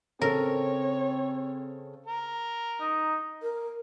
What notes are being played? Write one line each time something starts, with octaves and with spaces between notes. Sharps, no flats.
C#3 C4 A4 A#4 C#5
A#4
D#4
A#4